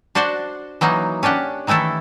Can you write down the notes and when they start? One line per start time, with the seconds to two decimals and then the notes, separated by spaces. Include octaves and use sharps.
0.15 D4 F#4 C5 D5 F#5
0.81 E3 F#3 A#3 D#4
1.23 C#4 D4 G4 F#5
1.67 D#3 E3 A3 E4 A4